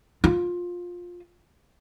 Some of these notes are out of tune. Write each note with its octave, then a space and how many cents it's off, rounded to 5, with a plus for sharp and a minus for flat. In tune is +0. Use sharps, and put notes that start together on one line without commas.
F4 +15